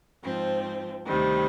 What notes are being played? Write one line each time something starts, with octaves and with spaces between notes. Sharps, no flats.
G#2 F3 C4
D2 C3 D#3 G3